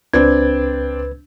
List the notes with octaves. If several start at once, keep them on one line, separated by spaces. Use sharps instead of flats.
C#2 C4 D4 B4 G#6